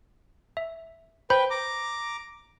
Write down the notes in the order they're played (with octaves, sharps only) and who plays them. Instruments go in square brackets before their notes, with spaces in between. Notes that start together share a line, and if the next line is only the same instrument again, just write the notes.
[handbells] E5
[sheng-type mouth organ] B4 G5 [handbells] C5 B5 G6
[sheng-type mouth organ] A#5 D6